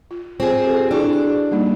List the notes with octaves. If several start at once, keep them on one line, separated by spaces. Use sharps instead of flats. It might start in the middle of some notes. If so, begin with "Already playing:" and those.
F4
C4 F4 G#4
G4 A4
D4 E4 F#4 G#4
G3 A#3 D#4